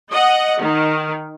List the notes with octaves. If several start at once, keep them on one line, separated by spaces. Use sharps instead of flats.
D#5 F#5
D#3